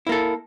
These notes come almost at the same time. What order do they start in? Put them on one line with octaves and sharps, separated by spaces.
E4 A#3 A4